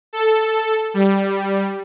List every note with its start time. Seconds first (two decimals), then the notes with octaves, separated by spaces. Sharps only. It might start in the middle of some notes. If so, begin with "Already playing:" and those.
0.13 A4
0.94 G3